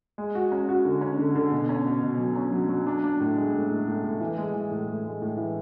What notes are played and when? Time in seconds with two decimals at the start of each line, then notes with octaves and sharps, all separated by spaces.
0.18 G#3
0.35 F#4
0.52 C#4
0.69 F#4
0.85 D3
1.01 C#4
1.19 D3
1.35 D3
1.52 B2
1.69 C#4
1.85 B2
2.03 B2
2.19 F#3
2.36 C#4
2.52 F#3
2.69 F#3
2.86 D4
3.04 D4
3.20 A2
3.37 G#3
3.54 A2
3.70 A2
3.87 A2
4.04 A2
4.20 E3
4.38 G#3
4.54 E3
4.71 A2
4.88 A2
5.05 G#3
5.22 A2
5.37 E3